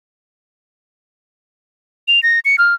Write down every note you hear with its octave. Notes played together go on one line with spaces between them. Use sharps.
F7
A#6
C#7
F6